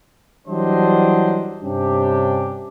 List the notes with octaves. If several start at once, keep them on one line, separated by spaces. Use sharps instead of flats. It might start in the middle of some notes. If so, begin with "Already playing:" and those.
E3 F#3 G3 D4 C5 D#5
G2 C3 C#4 D4 G4